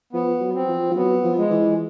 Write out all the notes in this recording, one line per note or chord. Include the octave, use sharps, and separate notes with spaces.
F3 B3
F#3
C4
F3
F3
F#3 B3
F3
G#3
E3